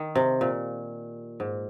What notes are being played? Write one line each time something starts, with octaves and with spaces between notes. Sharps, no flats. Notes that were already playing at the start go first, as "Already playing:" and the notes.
Already playing: D#3
C3
A#2
G#2